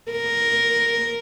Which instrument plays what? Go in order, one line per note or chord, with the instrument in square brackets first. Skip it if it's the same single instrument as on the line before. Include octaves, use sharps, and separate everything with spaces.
[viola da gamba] A#4